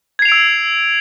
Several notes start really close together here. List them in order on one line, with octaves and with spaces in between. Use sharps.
G#6 C7 F7 D7 E6